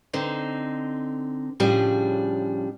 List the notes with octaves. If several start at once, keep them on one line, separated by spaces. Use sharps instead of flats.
D3 C4 D#4
A2 C#3 F3 G3 D4 G#4